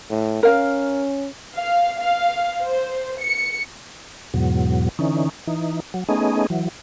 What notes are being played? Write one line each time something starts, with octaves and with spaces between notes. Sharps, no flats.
A2
C#4 A#4 F5
F5
F5
C5
C#7
E2 G#2 B2 F#3
D3 E3 C#4 D#4
E3 D#4
F#3
A3 B3 C#4 D#4 G#4 D#5
E3 F#3